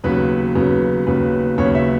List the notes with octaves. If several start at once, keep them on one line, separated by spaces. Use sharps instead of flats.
D#2 C#3 F#3 B3 B4
D#2 C#3 F#3 B3
D#2 C#3 F#3 B3 B4
D#2 C#3 F#3 B3 C#5
E5